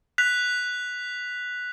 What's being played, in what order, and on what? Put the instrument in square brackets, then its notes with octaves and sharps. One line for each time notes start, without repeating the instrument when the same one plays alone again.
[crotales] F#6 B6 F7